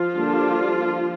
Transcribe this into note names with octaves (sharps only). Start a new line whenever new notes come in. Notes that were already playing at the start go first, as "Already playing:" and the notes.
Already playing: F3 F4
D3 G3 A#3 D4